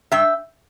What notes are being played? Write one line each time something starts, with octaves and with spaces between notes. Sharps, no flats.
G2 E5 G5